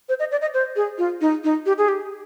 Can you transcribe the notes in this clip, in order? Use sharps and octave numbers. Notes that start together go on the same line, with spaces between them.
C5
D#5
D5
D#5
C5
G#4
F4
D#4
D#4
G4
G#4
G4